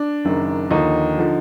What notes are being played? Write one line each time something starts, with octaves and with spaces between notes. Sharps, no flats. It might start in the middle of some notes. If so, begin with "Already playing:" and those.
Already playing: D4
F#1 F#2 D#3
D#2 D3 F3 D#4
D3 F3